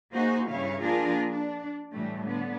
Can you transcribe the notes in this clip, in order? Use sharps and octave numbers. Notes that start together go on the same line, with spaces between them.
A#3 D#4 F#4 G#4 C5
G2 C#3 E4 C#5 F5
F3 A#3 D4 F4 G#4 A#4
D4
A2 E3 G3 A3
D3 B3